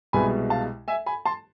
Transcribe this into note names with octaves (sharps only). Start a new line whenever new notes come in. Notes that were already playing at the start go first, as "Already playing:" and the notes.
C2 B2 G#3 G#5 B5
F5 A5
E5 G#5
G#5 B5
A5 C6